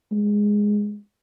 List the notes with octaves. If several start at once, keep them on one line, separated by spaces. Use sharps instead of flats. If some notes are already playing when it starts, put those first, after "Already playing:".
G#3